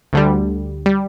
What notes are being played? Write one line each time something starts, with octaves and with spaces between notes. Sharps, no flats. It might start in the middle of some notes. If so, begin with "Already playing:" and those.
D2 D3 G3
G3